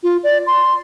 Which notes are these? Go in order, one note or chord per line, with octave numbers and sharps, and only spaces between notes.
F4
D5
C6